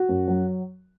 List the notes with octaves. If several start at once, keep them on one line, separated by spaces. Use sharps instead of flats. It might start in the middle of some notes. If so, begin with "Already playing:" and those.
Already playing: F#4
F#2
F#3